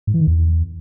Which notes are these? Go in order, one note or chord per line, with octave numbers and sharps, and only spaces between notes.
G#2
E3
D#3
E2